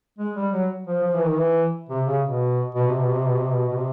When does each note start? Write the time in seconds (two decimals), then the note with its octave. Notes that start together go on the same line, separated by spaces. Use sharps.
0.19 G#3
0.36 G3
0.52 F#3
0.87 F3
1.03 F3
1.15 E3
1.25 D#3
1.36 E3
1.89 C3
2.06 C#3
2.24 B2
2.75 B2
2.88 C3
3.00 B2
3.13 C3
3.26 B2
3.39 C3
3.51 B2
3.69 B2
3.77 C3